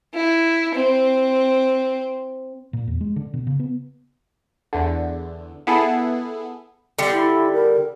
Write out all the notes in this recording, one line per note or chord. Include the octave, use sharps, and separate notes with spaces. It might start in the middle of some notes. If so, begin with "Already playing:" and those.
E4
C4
A#2
E2
G#3
D3
B2
C#3
B3
E2 D3
B3 E4 G#4 A4
D3 G3
E4
A#4